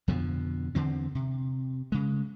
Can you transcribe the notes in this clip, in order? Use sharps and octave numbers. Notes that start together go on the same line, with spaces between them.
F2 B2 D3 F3
E2 D3 C4
C3
C#3 G#3